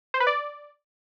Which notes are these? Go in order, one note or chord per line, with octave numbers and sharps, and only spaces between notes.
C5
B4
D5